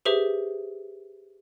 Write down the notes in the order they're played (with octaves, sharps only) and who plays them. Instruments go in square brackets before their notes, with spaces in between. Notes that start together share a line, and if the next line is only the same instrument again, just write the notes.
[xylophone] G4 G#4 B4 C5 E5